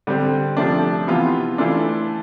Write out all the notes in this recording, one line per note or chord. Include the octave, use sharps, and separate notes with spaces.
D3 G3 C4
C3 F3 A3 D4
C3 E3 B3 F4
E3 A3 D4 F4